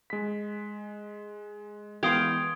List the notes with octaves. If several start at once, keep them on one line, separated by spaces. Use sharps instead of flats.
G#3 B6
E3 G#3 B3 F5 G5 C6 D#6 G#6